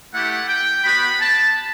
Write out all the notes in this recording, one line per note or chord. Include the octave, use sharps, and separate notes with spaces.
A3 E4 G4 F#5
G5
B3 F#4 B5
A5